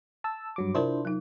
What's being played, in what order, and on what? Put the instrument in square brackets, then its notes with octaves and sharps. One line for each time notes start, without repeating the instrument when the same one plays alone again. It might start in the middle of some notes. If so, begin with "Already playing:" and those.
[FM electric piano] A5 E6
G2 F#3 D6
[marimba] C3 F4 A#4 [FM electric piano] D4 E4 C5
[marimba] F#3 D#4